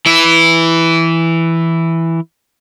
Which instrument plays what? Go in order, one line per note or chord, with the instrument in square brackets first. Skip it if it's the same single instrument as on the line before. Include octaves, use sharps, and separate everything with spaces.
[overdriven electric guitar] E3 E4